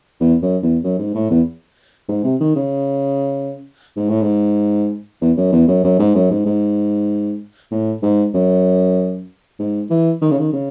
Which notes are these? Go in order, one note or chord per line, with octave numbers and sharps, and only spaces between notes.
E2
F#2
E2
F#2
G#2
A2
E2
G#2
C3
D#3
C#3
G#2
A2
G#2
E2
F#2
E2
F#2
F#2
G#2
F#2
G#2
G#2
A2
G#2
F#2
G#2
E3
D#3
C#3
D#3
C#3